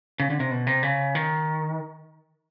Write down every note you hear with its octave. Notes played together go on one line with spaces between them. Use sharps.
C#3
D3
C3
B2
C3
C#3
D#3